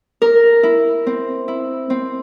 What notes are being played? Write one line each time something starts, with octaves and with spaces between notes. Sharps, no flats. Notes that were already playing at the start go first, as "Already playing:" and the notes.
A#4
E4
C4
E4
C4